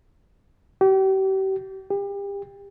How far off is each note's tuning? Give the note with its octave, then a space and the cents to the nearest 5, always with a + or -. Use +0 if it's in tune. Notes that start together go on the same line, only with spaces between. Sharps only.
G4 -35
G4 +35